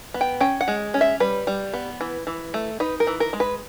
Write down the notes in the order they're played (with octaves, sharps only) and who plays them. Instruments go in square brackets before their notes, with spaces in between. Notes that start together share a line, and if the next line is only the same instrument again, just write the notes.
[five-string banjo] B3
G5
C#4 G5
F#5
G#3
C#4
E5
G3 B4
G3
B3
E3
E3
A3
D#4 B4
A#4
E3
A#4
G#3
B4